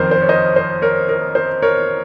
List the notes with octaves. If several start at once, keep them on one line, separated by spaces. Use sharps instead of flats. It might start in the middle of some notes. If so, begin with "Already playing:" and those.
Already playing: F#1 F2 D#3 A#4 C5
C5
C#5
C5 D#5
C5
A#4 C#5
A#4
C5
A#4 C#5